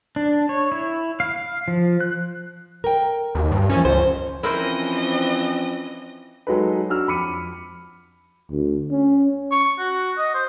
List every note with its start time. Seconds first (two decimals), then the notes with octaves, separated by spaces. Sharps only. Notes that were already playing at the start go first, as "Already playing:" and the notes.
0.16 D4
0.49 C#5
0.72 E4
1.20 F5
1.36 F5
1.68 F3
2.00 F#6
2.84 A#4 G5
3.35 D#2
3.51 G2
3.70 E3 F3 A#3 C#4
3.85 C#2 C5
4.43 E3 F3 C4 C#4 E4 A#4 C5 D#5
6.47 F#3 G#3 D#4 A4 B4
6.89 D4 F#4 E6 F6
7.08 F2 B5 D6 C#7 D#7
8.51 D2
8.91 C#4
9.51 C#6
9.79 F#4
10.18 D#5
10.34 C5